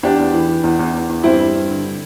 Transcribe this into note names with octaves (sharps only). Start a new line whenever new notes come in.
E2 D4 G4
E2
E3
E3
E2
E2
E2
E2
G2 C4 E4
G2
G2
D3
D3